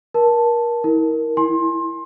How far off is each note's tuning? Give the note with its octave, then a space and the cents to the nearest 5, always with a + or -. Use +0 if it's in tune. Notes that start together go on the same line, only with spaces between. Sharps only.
A#4 +30 A5 +0
E4 -40 A#4 +5
E4 +10 G#5 +10 C6 +25